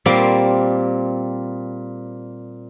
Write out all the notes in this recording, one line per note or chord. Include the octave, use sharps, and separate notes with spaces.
A#2 G3 A#3 C4